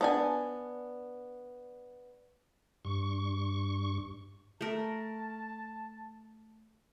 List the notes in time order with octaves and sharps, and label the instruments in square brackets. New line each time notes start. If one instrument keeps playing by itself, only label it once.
[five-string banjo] B3 D4 G#5
[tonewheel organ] G2 C#6
[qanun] A3 A#4 [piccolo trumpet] A5